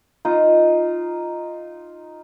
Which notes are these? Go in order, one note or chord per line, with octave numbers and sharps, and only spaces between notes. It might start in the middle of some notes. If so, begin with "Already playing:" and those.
D#4 F4